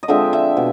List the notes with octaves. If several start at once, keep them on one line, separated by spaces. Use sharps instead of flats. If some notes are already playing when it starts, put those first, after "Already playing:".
D#5
D3 F3 G#3 C4 E5
E5
B2